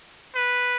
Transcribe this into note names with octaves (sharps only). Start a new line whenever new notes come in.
B4